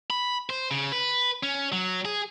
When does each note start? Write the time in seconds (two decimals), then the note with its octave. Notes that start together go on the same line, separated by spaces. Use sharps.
0.10 B5
0.50 C5
0.71 C#3
0.92 B4
1.43 C#4
1.72 F#3
2.05 G#4